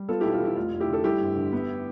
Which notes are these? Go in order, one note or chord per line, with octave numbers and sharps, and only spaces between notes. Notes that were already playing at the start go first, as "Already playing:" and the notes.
Already playing: G3
B3 F4 A4
B1 E4 G4
F4
E3 E4
F1 F4
F1
E4 G4
D3 A4
G3 E4 G4
G1
D3
B3